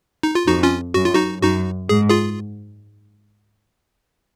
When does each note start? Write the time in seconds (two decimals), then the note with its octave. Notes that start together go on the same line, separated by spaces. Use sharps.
0.23 D#4
0.35 F4
0.47 F2 D#4 F#4
0.63 C#4 F4
0.94 F#2 F#4
1.05 F4
1.15 D#4 F#4
1.42 F#2 D#4 F#4
1.89 G#2 G#4
2.10 F4 G#4